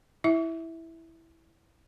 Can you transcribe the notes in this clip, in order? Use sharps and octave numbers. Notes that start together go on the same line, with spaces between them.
E4 E5